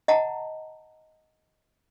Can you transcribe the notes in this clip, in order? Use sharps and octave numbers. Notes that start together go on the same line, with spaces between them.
D#5 F#5 A5 A#5